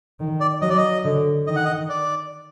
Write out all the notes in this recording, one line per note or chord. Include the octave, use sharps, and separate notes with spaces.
D#3
D5
F#3 D#5
D5
D#5
D3
D#3 D#5
F#5
D#5
D5